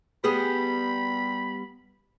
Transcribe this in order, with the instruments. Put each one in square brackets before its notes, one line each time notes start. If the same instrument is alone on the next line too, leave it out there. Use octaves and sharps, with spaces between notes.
[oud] G3 B3 G#4 [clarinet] B5